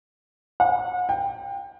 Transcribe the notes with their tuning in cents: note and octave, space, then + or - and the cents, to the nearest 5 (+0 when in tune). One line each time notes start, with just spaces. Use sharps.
F#5 -35
G5 +20